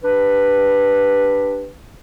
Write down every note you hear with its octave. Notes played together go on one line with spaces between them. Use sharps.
D4 G4 B4